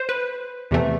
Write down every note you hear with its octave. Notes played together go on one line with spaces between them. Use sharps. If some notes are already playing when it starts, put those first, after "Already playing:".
Already playing: C5
B4
E2 C3 E3 A3